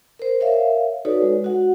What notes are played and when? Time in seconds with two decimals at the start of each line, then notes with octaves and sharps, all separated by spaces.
0.19 A#4 C5
0.40 A#4 C#5 E5 F5
1.05 D#4 F#4 A4 B4 C#5 D5
1.22 G#3
1.44 F#4 F#5